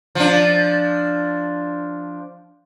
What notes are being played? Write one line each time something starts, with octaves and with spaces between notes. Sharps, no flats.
F3 D4